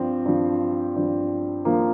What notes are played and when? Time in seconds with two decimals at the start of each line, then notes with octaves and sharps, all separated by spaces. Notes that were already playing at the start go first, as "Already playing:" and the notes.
Already playing: G2 F3 C4
0.26 G2 F3
0.96 G2 F3
1.65 G2 F3 A#3